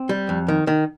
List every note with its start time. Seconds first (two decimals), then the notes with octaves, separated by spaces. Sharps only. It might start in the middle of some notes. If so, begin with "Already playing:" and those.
Already playing: C4
0.09 G3
0.29 F2
0.48 D#3
0.67 D#3